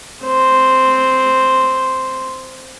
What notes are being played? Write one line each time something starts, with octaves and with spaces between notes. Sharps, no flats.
C4 C5